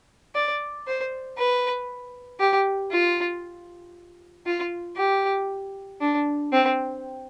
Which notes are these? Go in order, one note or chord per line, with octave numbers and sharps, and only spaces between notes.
D5
C5
B4
G4
F4
F4
G4
D4
C4